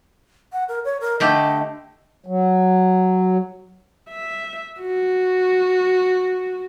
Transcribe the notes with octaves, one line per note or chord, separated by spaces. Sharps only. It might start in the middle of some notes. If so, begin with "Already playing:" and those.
F#5
A#4
C#5
A#4
D3 A3 G4 D#5
F#3
E5
F#4